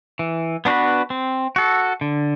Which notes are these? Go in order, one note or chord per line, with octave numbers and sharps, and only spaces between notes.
E3
B3 D4 F#4 B4
C4
F#4 A4
D3